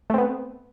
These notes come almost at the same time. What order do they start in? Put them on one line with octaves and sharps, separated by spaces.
A3 C4 B3